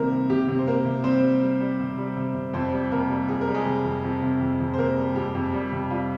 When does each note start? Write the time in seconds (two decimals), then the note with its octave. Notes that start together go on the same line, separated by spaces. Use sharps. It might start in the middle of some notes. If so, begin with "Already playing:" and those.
Already playing: C3 D#3 G3 A#3 C4 A#4
0.11 C3
0.30 C3 G4
0.48 C3
0.59 C5
0.67 C3 A#3 A#4
0.85 C3
1.04 G3 C4 C5
1.23 G3
1.42 G3
1.60 G3
1.80 C3
1.98 G3
2.17 C3
2.35 C3
2.53 F2 C4 C5
2.72 G3
2.91 C3 A#3 A#4
3.09 G3
3.28 F2 G#4
3.41 A#4
3.47 G3
3.54 G#3 G#4
3.66 C3
3.85 F2
4.04 F2
4.22 C3
4.41 F2
4.60 F2
4.74 C5
4.78 C3 A#3 A#4
4.97 G3
5.15 F2 G4
5.35 F2
5.53 G3
5.72 C3
5.90 G3 F4